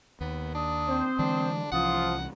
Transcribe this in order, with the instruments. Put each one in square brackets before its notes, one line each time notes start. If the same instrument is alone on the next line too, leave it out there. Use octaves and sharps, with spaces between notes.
[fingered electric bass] D#2 [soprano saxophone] B3
[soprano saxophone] D4 [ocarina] D#6
[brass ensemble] C4 C5
[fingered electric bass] D3 E3 G#3 [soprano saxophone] D4
[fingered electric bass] C2 E3 C#4 [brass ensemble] F3 F4 [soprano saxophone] F#5 [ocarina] D#6